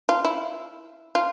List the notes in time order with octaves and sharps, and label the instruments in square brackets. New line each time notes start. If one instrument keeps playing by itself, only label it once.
[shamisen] F4
E4
F4